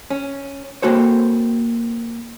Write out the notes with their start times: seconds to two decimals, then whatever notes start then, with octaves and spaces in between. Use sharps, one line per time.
0.10 C#4
0.82 A#3 C4 F#4 A4 C5 C#5